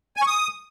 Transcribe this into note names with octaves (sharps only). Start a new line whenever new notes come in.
G#5
C#6
D#6